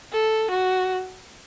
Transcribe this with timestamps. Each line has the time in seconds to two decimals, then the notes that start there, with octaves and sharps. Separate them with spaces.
0.13 A4
0.51 F#4